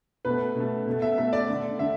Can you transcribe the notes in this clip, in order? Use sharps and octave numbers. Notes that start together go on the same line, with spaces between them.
B2 A3 B4
B2 A3
B2 A3
E5
B2 A3 E5
D5
D3 A3
D3 E5